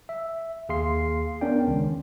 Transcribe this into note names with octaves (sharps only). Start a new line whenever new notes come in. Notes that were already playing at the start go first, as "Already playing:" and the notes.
E5
D#2 G#4 F5 C6 C7
B3 C#4 D4 A#4 D5 G5
C#2 D#3